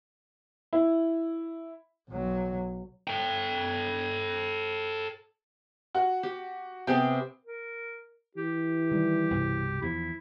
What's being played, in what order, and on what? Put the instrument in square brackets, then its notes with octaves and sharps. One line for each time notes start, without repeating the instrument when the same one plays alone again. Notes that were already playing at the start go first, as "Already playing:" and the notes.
[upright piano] E4
[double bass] B1 F#3
[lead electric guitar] A4 G5
[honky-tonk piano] F#4
[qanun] G4
[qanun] C3 B3 G#4 [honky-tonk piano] G5
[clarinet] A#4
[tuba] E3 [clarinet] G4
[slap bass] D#3 G3
C2 G2 B2
[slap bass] E2 F3 [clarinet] E4